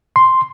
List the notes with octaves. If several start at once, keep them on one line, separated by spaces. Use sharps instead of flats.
C6